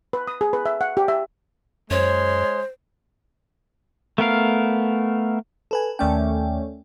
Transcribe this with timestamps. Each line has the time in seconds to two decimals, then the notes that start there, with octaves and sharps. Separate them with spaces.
0.13 B4
0.27 D#6
0.41 G#4
0.53 B4
0.66 E5
0.81 F#5
0.97 G4
1.08 E5
1.91 F#2 G#3 C5 C#5 C6
4.18 A3 B3 A#4 F5
5.71 A4 B4 G#5
5.99 D#2 A3 C#4 D5 G5